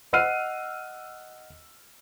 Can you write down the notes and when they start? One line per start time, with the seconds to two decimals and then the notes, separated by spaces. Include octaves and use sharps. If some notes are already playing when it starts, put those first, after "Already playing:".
0.13 D#5 F#5 E6 F6 C7 D#7